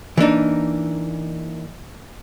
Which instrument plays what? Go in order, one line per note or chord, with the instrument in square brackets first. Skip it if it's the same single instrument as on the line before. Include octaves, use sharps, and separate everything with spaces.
[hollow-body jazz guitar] E3 A#3 D4 D#4